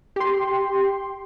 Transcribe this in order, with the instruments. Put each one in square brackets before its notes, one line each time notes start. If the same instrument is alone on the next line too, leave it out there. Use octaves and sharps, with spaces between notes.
[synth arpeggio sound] G4 C6